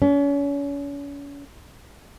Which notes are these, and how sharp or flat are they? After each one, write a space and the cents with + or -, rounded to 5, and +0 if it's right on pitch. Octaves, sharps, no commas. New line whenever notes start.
C#4 +35